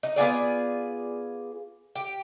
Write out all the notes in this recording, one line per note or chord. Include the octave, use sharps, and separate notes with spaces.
D#4
B3 F4 G#4 D5
G4